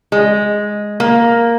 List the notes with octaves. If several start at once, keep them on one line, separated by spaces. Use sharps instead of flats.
G#3
A#3